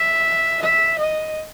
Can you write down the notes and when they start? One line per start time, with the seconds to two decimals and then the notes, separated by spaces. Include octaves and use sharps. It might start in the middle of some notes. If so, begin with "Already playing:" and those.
Already playing: E5
0.62 E5
0.99 D#5